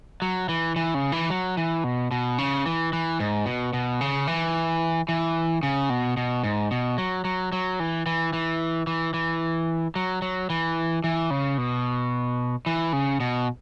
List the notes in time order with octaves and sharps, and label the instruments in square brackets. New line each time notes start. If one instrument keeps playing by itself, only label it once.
[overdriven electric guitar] F#3
E3
E3
C#3
E3
F#3
E3
B2
B2
C#3
E3
E3
G#2
B2
B2
C#3
E3
E3
C#3
B2
B2
G#2
B2
F#3
F#3
F#3
E3
E3
E3
E3
E3
F#3
F#3
E3
E3
C#3
B2
E3
C#3
B2